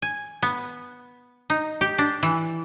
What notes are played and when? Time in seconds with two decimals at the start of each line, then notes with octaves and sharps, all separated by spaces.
0.02 G#5
0.42 B3
1.50 D#4
1.81 G4
1.98 D4
2.23 E3